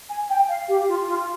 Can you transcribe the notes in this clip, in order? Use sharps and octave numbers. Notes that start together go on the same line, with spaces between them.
G#5
G5
F5
G4
F4
F4